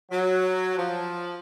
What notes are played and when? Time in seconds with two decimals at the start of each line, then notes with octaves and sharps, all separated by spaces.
0.11 F#3
0.76 F3